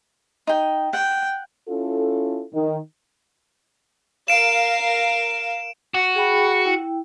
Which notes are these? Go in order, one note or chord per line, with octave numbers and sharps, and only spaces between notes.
D#4 G5
F#5 G5
C#4 E4 F4 A4
D#3
A#4 F5 D7 E7
F#4
G#4 G5 B5
E4 G5